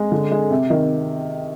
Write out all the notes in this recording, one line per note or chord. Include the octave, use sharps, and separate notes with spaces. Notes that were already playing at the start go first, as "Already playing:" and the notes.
Already playing: G#3
D3
G#3
C3
D#3